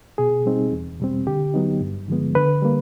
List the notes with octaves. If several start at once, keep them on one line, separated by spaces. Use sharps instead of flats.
B2 G#4
G3 C4 D#4
E2
B2 G3 C4
D3 G4
F#3 B3 D#4
G2
D3 F3 G#3 B3
D3 B4
G3 A#3